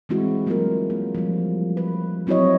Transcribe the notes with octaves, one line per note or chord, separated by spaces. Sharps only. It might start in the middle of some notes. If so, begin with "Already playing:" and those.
E3 G3 G#3 C4 E4 F#4
F#3 A3 A#3 C4 F4 A#4
A#3
F3 G3
B4
F#3 C4 E4 F#4 C#5 D#5